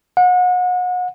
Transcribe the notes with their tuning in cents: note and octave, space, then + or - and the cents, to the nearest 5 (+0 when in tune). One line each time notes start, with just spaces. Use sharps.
F#5 -35